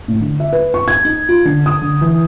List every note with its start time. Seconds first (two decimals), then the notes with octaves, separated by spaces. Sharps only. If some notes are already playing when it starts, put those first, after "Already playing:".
0.08 A2
0.20 D3
0.40 E5
0.53 B4
0.74 C#6
0.88 G#6
1.05 D#4
1.29 F4
1.45 D3
1.66 D#6
1.82 D3
2.01 E3